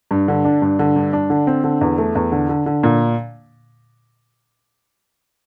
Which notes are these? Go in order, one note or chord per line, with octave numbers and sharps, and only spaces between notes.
G2
D3
D4
G2
D3
G2
D4
D3
C4
D3
E2
A3
E2
D3
D3
D3
A#2